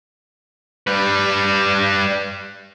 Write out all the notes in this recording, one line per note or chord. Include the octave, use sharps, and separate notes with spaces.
G3 B4